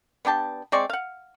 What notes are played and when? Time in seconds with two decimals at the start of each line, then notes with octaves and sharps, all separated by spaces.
0.25 B3 D4 G4 A5
0.72 G#3 C4 D5 C#6
0.90 F5 F#5